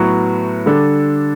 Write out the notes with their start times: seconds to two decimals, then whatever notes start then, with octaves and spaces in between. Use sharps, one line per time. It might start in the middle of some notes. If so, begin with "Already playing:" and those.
Already playing: A2 F#3 B3 F#4
0.66 D3 G3 D4 A4